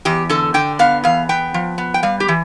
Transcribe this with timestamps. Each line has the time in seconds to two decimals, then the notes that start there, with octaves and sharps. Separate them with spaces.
0.05 E2 G4
0.29 D3 A4
0.54 D3 G5
0.79 B3 F5
1.04 E2 F5
1.29 B3 G5
1.54 F3
1.78 B3
1.94 G5
2.03 G3 F5
2.20 G4
2.28 E3